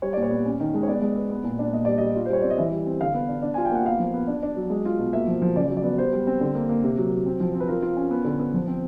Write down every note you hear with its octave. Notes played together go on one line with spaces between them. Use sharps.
G3 C#5
A#2 D5
C#5
B3
C#4
D#3
G#3
C#5
B3 D5
G#3
B3
B3
A#2
D4
A#2 D#5
G3 D5
G3 D#5
F4
C5
G3 C#5
C4 D5
D#5
E3 E5
G3
C4
D3 F5
B3
D4
D4
F4 G#5
G5
A#3 F#5
B3 F5
F3
B3
D4
D4
F#3
G#3
F4
B2
A#3 E5
F3
F3
C#3 D5
F#3
D5
B3
G3 C5
G3
C4
D3
A#3
A#3
C3
F#3
F#3
C4
F3
C4
B4
F4 A#4
F4
C#4
B3
D3
B3
F3
C4